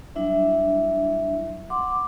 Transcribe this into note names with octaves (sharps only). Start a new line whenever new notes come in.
F#3 G3 D4 E4 E5
F#5 C6 D6